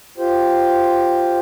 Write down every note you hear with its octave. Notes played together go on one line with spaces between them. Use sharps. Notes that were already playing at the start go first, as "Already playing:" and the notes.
F4 G4 C5